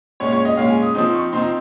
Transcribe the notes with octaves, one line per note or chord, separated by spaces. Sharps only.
A#2 G#3 C#4 C#5
C#5
D#5
A#2 G#3 C#4 F5
G#5
D#6
F3 C4 D#4 D#6
C#6
F3 C4 D#4 C6
A#5